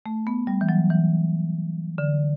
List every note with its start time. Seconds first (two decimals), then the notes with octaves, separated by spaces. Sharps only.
0.06 A3
0.27 B3
0.47 G3
0.61 E3
0.69 F#3
0.90 E3
1.98 D3